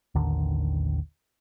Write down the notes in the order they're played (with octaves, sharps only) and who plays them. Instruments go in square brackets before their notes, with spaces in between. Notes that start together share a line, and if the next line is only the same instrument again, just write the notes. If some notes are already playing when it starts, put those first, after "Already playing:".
[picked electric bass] A1 D#2 D3 D#3